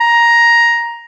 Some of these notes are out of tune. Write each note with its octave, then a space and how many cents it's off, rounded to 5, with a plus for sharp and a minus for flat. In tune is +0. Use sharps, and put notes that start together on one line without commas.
A#5 +10